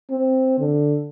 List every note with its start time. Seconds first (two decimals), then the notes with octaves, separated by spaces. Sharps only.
0.10 C4
0.59 D3